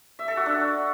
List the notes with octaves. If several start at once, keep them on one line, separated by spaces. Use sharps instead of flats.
E5
A4
F#4
D4